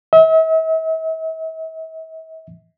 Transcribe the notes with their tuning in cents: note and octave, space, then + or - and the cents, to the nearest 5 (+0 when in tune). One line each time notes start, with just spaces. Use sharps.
E5 -45